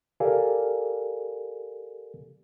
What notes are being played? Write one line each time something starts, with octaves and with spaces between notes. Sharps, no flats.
G4 A4 A#4 D5 F5 G#5